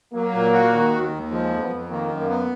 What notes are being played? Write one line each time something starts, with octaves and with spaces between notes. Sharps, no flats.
F#3 A#3
A#2
F#4
D#3
D#2
D#2
F3 G#3
F2
B3
F2
D#3 A#3
F#2
A#3
B3